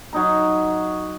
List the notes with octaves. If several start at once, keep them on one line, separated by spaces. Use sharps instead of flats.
F#3 D#4 A#5